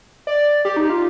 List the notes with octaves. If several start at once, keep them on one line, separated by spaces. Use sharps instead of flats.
D5
G4
D#4
F4